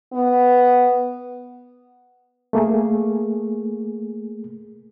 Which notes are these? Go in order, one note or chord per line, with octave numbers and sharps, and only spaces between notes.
B3
A3 A#3 G#4